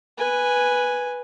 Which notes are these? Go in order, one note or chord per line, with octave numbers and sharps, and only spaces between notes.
B4 G#5